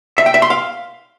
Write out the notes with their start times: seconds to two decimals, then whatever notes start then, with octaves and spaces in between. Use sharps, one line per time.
0.18 E5
0.26 G5
0.34 E5
0.42 C6
0.50 F5